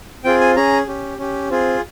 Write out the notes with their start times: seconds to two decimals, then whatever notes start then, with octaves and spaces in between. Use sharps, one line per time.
0.24 C4 F4 G#4 G5
0.40 G#5
0.56 C#4 G#4 A#5
0.87 C#4 G4
1.18 C#4 G4
1.50 C4 F4 G#4